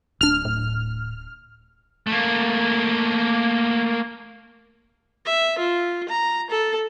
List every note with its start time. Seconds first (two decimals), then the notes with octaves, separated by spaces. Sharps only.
0.21 D1 D4 F6
0.45 A2
2.07 A3 A#3
5.25 E5
5.58 F4
6.09 A#5
6.50 A4